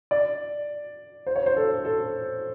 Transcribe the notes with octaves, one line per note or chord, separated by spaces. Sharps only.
D5
C5
C#5
C5
A4
A4